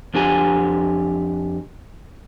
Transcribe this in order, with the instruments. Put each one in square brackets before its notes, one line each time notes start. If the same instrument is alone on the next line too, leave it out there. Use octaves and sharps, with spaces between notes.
[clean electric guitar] F2 D4 G4 G#5 A#5